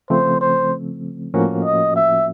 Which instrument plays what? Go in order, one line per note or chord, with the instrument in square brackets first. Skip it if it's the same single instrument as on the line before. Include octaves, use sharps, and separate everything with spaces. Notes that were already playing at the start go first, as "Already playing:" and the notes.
[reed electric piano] C#3 F3 A3 C4 [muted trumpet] C5
[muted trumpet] C5
[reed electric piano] A2 F3 A#3 C#4 F#4
[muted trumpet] D#5
E5